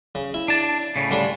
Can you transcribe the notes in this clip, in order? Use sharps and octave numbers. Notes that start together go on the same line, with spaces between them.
C#3
E4
D4 A5
A2 C#3
D3 G3 D4